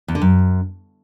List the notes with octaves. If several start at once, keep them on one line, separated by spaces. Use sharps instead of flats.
E2
D3
F#2